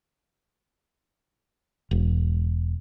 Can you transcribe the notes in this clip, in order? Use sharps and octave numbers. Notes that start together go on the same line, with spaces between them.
E1